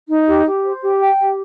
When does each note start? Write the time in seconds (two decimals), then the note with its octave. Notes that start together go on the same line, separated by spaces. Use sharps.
0.09 D#4
0.27 G4
0.46 G4
0.64 C5
0.82 G4
1.01 G5
1.20 G4